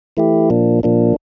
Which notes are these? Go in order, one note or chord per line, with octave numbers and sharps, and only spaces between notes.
E3 A3 E4 G4
A#2 F3 A#3 D4
A#2 F3 A#3 D4